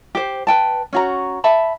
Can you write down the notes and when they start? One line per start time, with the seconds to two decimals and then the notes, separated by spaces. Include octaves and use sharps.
0.15 G4 C5
0.47 B4 G5 A5
0.93 C#4 F#4 A#5
1.44 E5 A5 B5